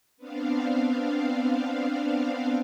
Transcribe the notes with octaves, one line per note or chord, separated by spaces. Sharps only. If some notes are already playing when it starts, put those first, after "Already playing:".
B3 C4 D4 F5